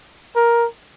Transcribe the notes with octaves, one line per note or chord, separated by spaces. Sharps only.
A#4